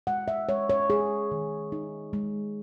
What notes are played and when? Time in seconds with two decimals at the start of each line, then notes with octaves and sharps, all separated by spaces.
0.07 G#3 F#5
0.28 E5
0.49 G#3 C#5
0.70 C#5
0.90 G#3 G#4
1.31 D#3
1.72 D#4
2.13 G#3